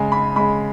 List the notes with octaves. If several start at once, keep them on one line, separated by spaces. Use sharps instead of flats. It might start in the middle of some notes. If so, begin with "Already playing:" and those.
Already playing: C#3 G#3 G#5
B5
C#3 G#3 B5